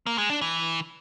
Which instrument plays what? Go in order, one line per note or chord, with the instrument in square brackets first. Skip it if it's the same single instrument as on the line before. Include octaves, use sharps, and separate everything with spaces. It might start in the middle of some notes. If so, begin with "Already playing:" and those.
[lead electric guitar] A#3
G#3
D4
E3